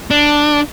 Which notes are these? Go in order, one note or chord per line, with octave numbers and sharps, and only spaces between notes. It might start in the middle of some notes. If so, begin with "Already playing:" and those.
D4